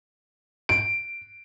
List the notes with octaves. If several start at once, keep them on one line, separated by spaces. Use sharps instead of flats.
D7